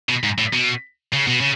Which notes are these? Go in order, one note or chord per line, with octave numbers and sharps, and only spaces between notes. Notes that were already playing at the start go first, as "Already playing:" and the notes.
B2
G#2
A2
B2
C#3
B2
C#3